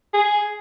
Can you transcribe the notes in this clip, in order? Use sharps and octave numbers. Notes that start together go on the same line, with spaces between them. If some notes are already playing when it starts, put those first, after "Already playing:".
G#4